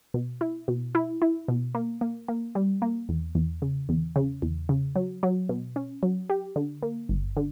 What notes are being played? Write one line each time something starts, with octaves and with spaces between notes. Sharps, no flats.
B2
E4
B2
E4
E4
B2
A#3
A#3
A#3
G3
A#3
E2
E2
C#3
E2
C#3
E2
C#3
F#3
F#3
B2
C#4
F#3
G4
D3
A#3
G1
D3